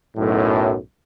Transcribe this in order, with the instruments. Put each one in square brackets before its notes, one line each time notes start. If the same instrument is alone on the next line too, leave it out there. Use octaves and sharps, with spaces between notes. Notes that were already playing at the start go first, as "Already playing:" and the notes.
[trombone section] B1 F#2 A2